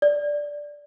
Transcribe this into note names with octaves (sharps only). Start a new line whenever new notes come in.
D5